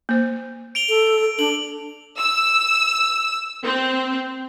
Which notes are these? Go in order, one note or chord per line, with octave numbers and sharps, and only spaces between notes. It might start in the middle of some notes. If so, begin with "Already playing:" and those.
A#3 C5
D7 F7 G7
A4
D4 A4 F#7
E6
C4